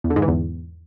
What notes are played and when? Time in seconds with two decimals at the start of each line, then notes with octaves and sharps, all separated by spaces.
0.04 E2
0.10 D3
0.16 G#2
0.22 E3
0.28 E2